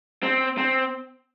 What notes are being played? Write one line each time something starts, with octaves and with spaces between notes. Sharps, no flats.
C4
C4